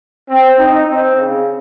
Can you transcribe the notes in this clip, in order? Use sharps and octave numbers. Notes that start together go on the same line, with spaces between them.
C4
D#4
C4
C#3